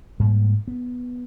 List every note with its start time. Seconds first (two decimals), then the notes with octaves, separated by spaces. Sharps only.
0.20 G#2 G3 A#3
0.68 B3